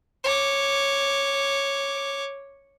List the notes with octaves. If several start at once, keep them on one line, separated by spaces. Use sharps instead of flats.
C#5 D6